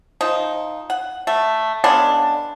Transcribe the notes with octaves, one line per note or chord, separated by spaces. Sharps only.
F3 D#4
F#5
A3
C#3 G#3 B3 D4